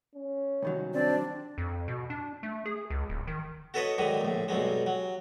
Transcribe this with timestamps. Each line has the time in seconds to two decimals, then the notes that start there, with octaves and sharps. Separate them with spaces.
0.15 C#4
0.62 C2 D#3 F#3
0.94 C4 D4 D5
1.58 F2
1.88 B2
2.10 D4
2.43 A3
2.66 G#4
2.90 C#2
3.09 D1
3.27 D#3
3.74 F#4 A4 B4 C#5 D#5
3.98 G#2 D3 D#3 F#3
4.21 A#1 A2
4.48 B1 G2 F#3 G#3
4.87 F#3